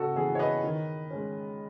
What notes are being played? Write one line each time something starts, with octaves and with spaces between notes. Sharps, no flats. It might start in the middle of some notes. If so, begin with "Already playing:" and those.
Already playing: C#3 F#4 A4
E3 B3 G#4
C#5
B4 D#5
D#3
G#3 C#4